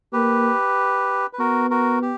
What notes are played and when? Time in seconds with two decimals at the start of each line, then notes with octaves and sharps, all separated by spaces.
0.13 A#3 G4 B4
1.33 B4
1.39 B3 F#4 A#4
1.70 F#4 A#4
2.02 G4